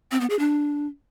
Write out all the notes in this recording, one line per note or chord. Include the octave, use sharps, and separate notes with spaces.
C4
B3
G#4
D4